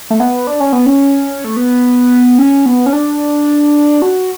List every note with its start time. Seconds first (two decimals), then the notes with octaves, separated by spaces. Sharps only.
0.10 A3
0.20 B3
0.47 D4
0.60 C#4
0.73 B3
0.86 C#4
1.44 A3
1.57 B3
2.39 C#4
2.66 B3
2.86 C#4
2.93 D4
4.02 F#4